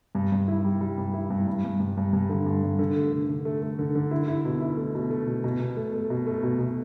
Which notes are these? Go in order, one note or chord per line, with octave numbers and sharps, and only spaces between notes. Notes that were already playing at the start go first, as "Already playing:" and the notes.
G2
G2
E4
G3
G3
G2
E4
G2
G2
G2
G2
G2
G2
D3
G2
G2
D3
A3
D3
D3
A3
A3
D3
D3
E4
E4
B2
E4
A3
B2
A3
B2
B2
B2
A3
A3
B2
A3
B2
B2